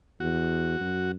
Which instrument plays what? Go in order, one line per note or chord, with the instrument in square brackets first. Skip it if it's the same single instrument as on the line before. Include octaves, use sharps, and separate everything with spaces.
[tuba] E2 [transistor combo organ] F#4
[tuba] F#2